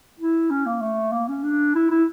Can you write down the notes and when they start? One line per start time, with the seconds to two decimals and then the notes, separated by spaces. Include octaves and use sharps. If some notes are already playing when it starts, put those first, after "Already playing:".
0.20 E4
0.50 C#4
0.66 A#3
0.81 A3
1.12 A#3
1.28 C#4
1.43 D4
1.75 E4
1.90 E4